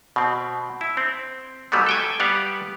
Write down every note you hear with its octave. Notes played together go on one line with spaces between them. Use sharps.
B2 C4
E4
C4
G#2 F#3 G3 A3 B3
A4 G5 G#5
G3 B3 G4 D5 F5 F#5